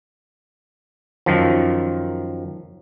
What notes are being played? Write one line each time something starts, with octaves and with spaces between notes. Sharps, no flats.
F#2 D#3 F3